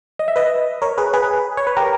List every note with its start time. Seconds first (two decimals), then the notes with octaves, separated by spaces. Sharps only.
0.19 D#5
0.28 E5
0.36 B4 D#5
0.82 A#4 C#5
0.98 G#4 B4
1.13 G#4 B4
1.57 C#5
1.67 B4
1.77 G4 A#4